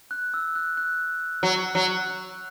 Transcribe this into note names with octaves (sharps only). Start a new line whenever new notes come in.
F#6
E6
F#6
F#6
F#3
F#3